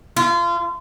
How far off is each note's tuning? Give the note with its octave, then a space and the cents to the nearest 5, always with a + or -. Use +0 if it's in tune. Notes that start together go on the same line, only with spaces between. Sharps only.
F4 -30